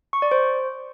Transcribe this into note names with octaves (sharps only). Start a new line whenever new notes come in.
C#6
D5
C5